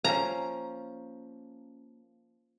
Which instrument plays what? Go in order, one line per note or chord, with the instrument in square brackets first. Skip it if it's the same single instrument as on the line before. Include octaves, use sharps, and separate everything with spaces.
[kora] F3 A#3 C#4 [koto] A#5